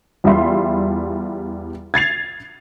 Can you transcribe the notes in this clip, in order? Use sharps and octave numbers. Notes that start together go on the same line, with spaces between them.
E2 G3 F4 E5 B5 C6
G#6 A6 C7 F7